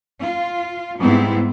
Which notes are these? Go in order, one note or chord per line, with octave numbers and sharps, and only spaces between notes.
F4
G#2 G3 B3 C4 E4